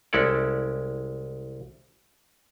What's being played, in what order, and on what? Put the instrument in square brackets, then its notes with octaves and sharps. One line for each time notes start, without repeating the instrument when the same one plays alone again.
[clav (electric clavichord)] C2 G#3 C#4 E4 A4 D5